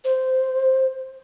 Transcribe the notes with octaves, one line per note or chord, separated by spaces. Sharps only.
C5